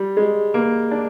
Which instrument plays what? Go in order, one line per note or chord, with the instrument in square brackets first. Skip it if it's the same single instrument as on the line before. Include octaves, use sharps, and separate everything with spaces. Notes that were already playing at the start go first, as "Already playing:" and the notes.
Already playing: [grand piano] G3
G#3
A#3
D4